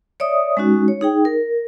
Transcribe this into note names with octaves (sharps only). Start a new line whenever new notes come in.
C#5 D5 E5 D#6
G#3 C#4 D#4 F#4
C#5
D#4 G#4 G5
A#4